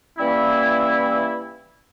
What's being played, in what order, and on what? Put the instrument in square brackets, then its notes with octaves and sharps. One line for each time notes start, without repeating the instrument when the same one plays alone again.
[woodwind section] E3 G3 A#3 C#4 E4